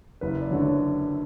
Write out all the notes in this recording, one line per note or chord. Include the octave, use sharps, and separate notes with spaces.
F#1 B4
D5
F#2 D3 C#5